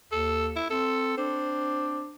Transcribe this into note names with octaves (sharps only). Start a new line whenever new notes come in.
D#2 A4
E4
C4 A4
C4 D4